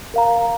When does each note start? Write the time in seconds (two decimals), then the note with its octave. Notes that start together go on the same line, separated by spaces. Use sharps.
0.14 A#4 F5 A#5